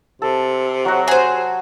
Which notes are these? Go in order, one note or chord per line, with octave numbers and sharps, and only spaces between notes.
C3 A4
F#3 F#4
G#4 C5